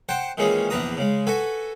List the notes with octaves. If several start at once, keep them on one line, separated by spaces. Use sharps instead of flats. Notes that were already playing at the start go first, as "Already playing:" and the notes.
C5 F#5 G5 A5
A#2 D#3 E3 G#3 C#4 G#4
A#1 E2 D4 B4 A#5 D#6
C#3 G#3
F#4 A4 B4 G#5